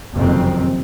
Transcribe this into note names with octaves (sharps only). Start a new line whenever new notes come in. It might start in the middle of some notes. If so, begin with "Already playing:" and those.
F#1 F2 C3 D#3 C4